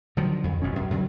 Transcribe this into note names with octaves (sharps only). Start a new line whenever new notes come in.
D3 D#3 F3 F#3
F2
F#1 F#2 B2 C#4
F#2
F#2 D3 F#3